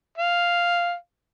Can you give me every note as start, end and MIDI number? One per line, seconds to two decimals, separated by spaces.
0.18 0.94 77